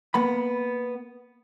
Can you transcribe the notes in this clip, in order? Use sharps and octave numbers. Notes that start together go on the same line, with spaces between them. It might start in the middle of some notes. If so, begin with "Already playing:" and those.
A#3 B3 B5